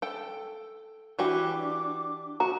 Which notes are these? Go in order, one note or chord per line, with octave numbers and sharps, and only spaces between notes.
A4 G5
E3 D4 F#4 G4 D6
F#4 A#5